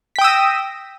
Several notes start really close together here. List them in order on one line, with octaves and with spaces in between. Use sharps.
B6 G5 D#6 E6 A#6